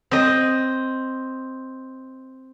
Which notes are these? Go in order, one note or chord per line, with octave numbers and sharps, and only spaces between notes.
C4 D#5